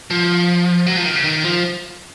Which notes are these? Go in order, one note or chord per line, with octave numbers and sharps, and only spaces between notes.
F3
F#3
F3
D#3
C#3
D#3
F3